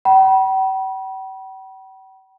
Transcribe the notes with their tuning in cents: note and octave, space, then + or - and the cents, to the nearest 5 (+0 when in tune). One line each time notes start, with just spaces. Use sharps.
G5 -45 B5 -35